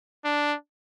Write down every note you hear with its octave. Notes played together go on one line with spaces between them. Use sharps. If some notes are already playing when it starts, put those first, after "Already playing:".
D4